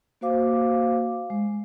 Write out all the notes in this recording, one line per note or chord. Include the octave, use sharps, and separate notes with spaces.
A#3 F#4 C5 F5 D6
G#3